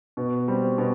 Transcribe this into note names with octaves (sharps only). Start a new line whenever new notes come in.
B2
G3 C4
B2